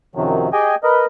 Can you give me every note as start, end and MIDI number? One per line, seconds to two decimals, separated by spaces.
0.15 0.49 42
0.15 0.49 48
0.15 0.49 51
0.15 0.49 53
0.15 0.49 54
0.53 0.75 67
0.53 0.75 68
0.53 0.75 75
0.53 0.75 79
0.53 0.75 80
0.84 1.06 70
0.84 1.06 71
0.84 1.06 75